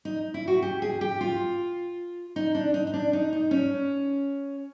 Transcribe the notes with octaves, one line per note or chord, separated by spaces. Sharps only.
D#4
E4
F#4
G4
G#4
G4
F4
D#4
D4
D#4
D#4
D4
D#4
D#4
C#4